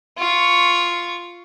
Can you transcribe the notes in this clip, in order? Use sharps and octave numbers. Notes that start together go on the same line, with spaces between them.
F4 C#6